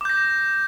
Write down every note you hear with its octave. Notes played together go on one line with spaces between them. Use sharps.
D6 G6 A#6